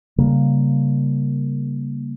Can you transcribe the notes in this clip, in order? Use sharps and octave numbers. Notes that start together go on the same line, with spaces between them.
C#3 G3 A#3